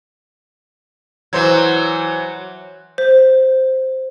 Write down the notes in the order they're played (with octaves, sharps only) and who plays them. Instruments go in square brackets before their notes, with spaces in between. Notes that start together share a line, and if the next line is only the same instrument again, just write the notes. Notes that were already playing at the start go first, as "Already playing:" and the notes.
[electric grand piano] E3 C5 G#6 [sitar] F#3
[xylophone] C5